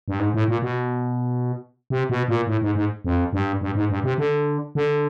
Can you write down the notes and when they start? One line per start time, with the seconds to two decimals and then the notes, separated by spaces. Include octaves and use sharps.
0.08 G2
0.19 G#2
0.34 A2
0.48 A#2
0.62 B2
1.90 C3
2.10 B2
2.28 A#2
2.47 A2
2.62 G#2
2.75 G#2
3.05 F2
3.33 G2
3.61 G2
3.75 G#2
3.90 G2
4.04 C3
4.18 D3
4.75 D3